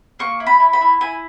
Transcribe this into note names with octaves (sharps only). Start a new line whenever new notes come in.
A#3 C#6
E4
B5
E4
B5
E4
E4 G#5